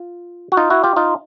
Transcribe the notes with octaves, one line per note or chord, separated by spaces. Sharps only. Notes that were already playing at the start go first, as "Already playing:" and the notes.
Already playing: F4
F#4
D#4 F4
E4 F#4
F4 G4
D#4 F4